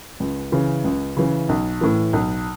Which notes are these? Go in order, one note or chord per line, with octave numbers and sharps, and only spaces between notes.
C#2
C#3 E3
C#2
C#3 E3
B1
A2 E3
B1